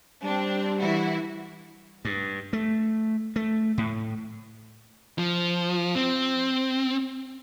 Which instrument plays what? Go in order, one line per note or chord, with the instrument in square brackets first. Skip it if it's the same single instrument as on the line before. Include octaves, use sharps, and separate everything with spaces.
[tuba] G3 [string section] C4 D4
[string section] E3 E4 F#4
[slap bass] G2
A3
A3
A2
[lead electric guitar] F3
C4